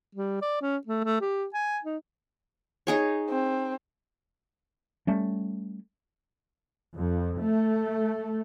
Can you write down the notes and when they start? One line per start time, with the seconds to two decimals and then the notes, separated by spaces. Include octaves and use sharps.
0.15 G3
0.42 D5
0.61 C#4
0.87 A3
1.04 A3
1.21 G4
1.54 G#5
1.84 D#4
2.87 D#4 G#4 C#5
3.30 C4
5.07 G3 A3 C#4
6.96 F2
7.39 A3